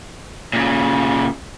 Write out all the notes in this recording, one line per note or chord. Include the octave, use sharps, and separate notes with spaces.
A#2 C#3